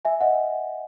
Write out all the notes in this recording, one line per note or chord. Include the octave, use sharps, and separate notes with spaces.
E5 G#5
D#5 F#5